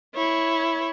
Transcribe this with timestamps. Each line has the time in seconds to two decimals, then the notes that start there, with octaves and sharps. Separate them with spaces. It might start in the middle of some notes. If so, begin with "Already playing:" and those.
0.15 E4 C#5